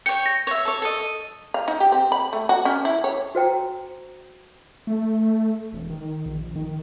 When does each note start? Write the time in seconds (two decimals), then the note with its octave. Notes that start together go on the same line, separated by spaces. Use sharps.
0.06 C#5 G5 C#7
0.26 A#6
0.47 C#5 E5
0.65 A4 C#5
0.82 A4 D#5
1.54 F5
1.68 D#4
1.80 G4
1.92 C4
2.12 B5
2.33 A3
2.49 F#4
2.65 C#4
2.85 E4
3.04 C#5
3.35 F#4 C5 G5 A#5
4.87 A3
5.73 E1
5.90 D#3
6.26 A#1
6.56 D#3